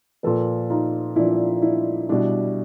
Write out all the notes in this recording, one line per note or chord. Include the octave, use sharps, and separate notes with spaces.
A#2 F3 A4 B4
D#4 F4
A#2 F3 D4 E4
D4 E4
B2 G3 D4 E4